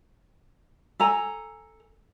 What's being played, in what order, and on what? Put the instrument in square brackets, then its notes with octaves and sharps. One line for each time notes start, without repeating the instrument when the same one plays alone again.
[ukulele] A4 G#5 A#5